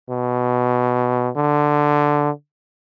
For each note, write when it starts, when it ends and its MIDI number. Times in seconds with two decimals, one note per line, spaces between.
0.10 1.30 47
1.37 2.30 50